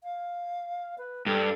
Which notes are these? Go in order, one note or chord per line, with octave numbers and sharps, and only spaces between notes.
F5
B4
G2 A4